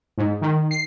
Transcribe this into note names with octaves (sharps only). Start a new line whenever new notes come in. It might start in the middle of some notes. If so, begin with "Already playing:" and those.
G#2
D#3
C7